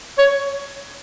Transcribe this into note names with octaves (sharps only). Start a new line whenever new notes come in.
C#5